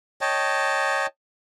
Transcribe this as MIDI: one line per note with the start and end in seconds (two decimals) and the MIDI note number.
0.21 1.07 73
0.21 1.07 75
0.21 1.07 79
0.21 1.07 81